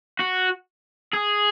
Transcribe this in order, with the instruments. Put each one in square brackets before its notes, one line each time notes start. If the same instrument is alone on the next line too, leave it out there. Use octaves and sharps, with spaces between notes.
[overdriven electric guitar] F#4
G#4